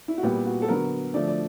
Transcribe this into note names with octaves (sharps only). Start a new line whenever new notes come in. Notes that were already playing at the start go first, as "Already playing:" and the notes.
E4
F#4
A#2 G3 B3 G4
F#4
A4
D3 F#3 B3 A#4
D3 F3 A3 D5
D5